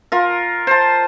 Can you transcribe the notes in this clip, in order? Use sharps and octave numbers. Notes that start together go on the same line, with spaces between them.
F4 A#4
C5 A5